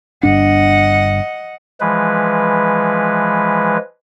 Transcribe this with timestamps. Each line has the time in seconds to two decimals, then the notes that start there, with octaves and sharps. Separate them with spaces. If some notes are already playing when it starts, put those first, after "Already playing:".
0.23 G1 G2 D4 D#5 F#5
1.80 E3 F3 G#3 B4